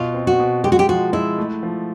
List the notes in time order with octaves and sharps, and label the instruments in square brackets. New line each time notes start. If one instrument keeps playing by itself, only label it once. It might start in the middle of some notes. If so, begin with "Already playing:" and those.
Already playing: [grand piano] B2 [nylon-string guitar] F4
[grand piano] C4
[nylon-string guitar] F#4
[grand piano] B2
[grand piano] G#3 [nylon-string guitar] G4
[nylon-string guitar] F#4
G4
[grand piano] F3 [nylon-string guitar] F#4
[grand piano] G#3 [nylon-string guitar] E4
[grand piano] A3
F3